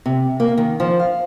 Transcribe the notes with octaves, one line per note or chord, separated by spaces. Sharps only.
C3
A#3
D#3
F3
F5